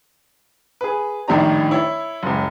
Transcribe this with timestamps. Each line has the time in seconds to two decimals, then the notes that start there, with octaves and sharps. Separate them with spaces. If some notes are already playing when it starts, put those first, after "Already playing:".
0.81 G#4 B4
1.28 A#1 A2 D#3 G3 D4 A#5
1.71 E4 C#5
2.23 F#1 C#2